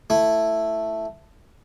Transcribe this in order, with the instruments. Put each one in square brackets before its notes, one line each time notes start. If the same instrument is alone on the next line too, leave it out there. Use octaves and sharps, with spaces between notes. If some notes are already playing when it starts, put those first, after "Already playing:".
[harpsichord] A3 E4